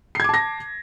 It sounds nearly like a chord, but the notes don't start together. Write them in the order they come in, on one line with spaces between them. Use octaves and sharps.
C7 G#6 D6 A5 A#6